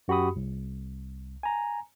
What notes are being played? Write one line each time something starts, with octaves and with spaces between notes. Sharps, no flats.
F#2 F#4 G4 B5 D#6
C2
G#5 A#5